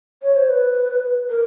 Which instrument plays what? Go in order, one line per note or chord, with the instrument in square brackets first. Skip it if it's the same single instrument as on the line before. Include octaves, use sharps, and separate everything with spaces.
[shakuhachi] C#5
C5
B4
A#4